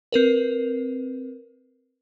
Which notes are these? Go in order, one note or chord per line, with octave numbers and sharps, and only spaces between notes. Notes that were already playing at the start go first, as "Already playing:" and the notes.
C4 A#4 B4